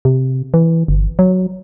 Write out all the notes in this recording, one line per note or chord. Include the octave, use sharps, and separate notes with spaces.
C3
E3
G1
F#3